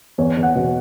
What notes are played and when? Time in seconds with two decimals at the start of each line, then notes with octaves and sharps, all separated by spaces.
0.18 E2 C#5
0.37 E2
0.43 F#5
0.55 B2